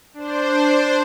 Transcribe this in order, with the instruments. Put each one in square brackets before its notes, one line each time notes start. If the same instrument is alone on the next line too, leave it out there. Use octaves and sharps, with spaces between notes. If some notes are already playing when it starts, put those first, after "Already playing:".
[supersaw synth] D4 C5